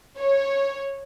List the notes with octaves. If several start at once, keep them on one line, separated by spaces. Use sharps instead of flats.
C#5